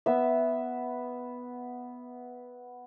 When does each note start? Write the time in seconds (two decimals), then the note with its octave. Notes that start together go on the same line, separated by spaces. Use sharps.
0.06 B3 E5